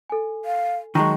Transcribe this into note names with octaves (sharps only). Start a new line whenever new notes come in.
A4 G#5
F5
D#3 F#3 G#3 A5 A#5 C#6 A#6